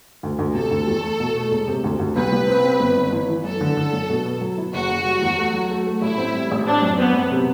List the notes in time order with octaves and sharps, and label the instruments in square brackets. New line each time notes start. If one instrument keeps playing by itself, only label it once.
[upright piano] D2
D2
[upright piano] C3 [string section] A4
[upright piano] D2
E2
A3
B2
A3
E1
C3
D2
D2
[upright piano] C2 [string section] B4
[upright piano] C2
C4
C4
G1
G1
E3
E3
[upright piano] F#2 [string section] A4
[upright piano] D3
D3
F#2
B2
B3
F#3
E4
[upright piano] F#1 [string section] F#4
[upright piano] F#1
G3
E2
A3
F#3
A3
A3
[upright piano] A1 [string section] E4
[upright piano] C4
G3
A1
[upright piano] C4 [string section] D4
[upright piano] F#2
[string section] B3 [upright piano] C4
[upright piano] F#2
C3